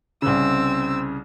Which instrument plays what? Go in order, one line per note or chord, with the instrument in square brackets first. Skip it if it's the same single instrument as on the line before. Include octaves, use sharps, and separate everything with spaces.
[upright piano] C2 C#3 [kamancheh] C4 E6